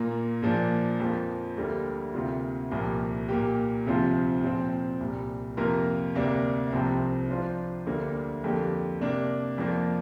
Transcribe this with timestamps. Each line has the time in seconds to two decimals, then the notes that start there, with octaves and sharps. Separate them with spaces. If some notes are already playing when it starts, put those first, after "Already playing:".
Already playing: A#2 A#3 F4 A#4
0.42 A#2 F3 A#3 D4
1.00 F2 F3 A#3
1.57 D2 D3 G3 A#3
2.14 D2 C3 A#3 F4
2.71 C2 A#2 F3 A#3 G4
3.29 A#2 A#3 G4
3.86 D2 C3 F3 C4 F4
4.43 A#2 F3 C4
5.00 C2 A#2 G3
5.57 F2 C3 A#3 F4 A#4
6.15 D2 C3 A#3 D4
6.72 C2 C3 F3 C4
7.29 F3 D4 F4 C5
7.86 D2 D3 G3 A#3 D4
8.44 F2 D3 A#3 G4
9.01 C3 A#3 D4
9.58 F2 F3 A#3 D4